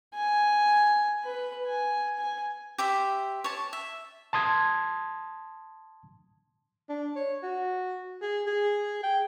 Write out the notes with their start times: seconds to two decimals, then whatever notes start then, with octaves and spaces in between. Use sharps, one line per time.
0.15 G#5
1.25 B4
1.67 G#5
2.19 G#5
2.78 G4 C5 E5
3.44 C#5 A5
3.73 E5
4.33 A5 C6 D#6 G#6
6.89 D4
7.16 C#5
7.43 F#4
8.22 G#4
8.46 G#4
9.03 G5